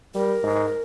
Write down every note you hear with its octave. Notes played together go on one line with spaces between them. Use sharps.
G3 A#4
G#2